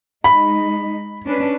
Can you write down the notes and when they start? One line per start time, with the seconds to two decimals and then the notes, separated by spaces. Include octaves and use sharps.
0.24 G#3 D#4 B5
1.24 C#4 D4 B4